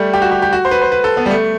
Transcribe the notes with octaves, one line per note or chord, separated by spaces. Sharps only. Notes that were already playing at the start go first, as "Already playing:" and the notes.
Already playing: G3 A3
G4
F#4
G4
G4
F#4
C5
B4
C5
B4
A4
B3
G3
A3